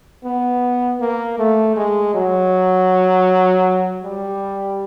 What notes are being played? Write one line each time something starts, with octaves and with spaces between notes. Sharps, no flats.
B3
A#3
A3
G#3
F#3
G3